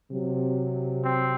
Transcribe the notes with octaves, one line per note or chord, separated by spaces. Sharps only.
C3 F#3
C4